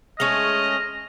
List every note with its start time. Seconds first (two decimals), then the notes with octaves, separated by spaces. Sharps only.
0.20 G#3 A3 C#4 D#5 F6